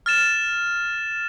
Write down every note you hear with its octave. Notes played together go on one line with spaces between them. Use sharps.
F6 A6 E7